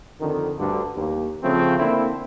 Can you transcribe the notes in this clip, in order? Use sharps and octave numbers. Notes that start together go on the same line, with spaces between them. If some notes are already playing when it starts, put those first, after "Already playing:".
F2 D3 D#3
D2 G2 D3
D#2
C#3 F3 A3 C4
D3 A#3 C4 E4